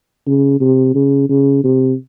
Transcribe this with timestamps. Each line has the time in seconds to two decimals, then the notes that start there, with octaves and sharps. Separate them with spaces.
0.27 C#3
0.60 C3
0.94 C#3
1.29 C#3
1.64 C3